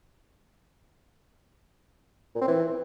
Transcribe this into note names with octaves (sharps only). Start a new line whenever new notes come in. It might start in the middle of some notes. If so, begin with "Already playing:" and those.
A#2
C4
E3